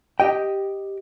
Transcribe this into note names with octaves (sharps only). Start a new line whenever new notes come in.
G4 D#5 G5